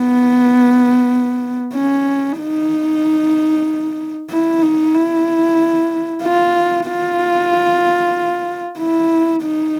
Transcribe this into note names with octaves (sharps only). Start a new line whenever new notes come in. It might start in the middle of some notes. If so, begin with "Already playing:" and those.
Already playing: B3
C#4
D#4
E4
D#4
E4
F4
F4
E4
D#4